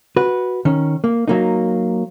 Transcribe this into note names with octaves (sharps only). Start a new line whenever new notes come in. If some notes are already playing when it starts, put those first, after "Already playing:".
F#4 B4
D#3 C#4
A#3
F#3 A#3 D#4